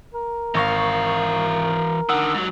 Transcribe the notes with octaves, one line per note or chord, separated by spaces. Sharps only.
A#4
G#1 E3 F5 C#6 A#6
D3 D#3 F#5 E6
G#2 F#3